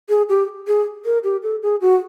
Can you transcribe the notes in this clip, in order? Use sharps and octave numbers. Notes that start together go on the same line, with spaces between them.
G#4
G4
G#4
A#4
G4
A4
G#4
F#4